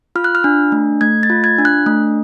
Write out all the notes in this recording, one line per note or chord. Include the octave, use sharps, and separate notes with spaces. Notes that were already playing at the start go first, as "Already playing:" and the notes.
F4 F6
F#6
F6
D4
A3
A3 G#6
A6
F4
G#6
D4
F#6
A3